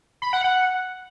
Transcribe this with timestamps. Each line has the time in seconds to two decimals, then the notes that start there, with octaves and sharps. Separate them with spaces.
0.22 B5
0.33 F#5
0.44 F#5